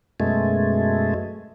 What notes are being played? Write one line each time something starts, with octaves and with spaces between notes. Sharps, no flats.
F#2 B2 G#3 A3